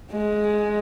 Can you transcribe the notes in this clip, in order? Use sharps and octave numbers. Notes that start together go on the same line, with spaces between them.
G#3